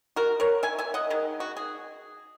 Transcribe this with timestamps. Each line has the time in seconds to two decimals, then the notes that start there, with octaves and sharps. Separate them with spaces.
0.16 F#4 A#4
0.40 A#4 C#5
0.63 E5 G#5
0.79 E5 G#5
0.94 D#5 F#5
1.10 D#3 G#3
1.40 F#4
1.57 G#4